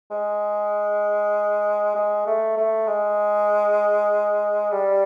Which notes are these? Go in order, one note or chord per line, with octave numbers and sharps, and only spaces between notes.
G#3
G#3
A3
A3
G#3
G3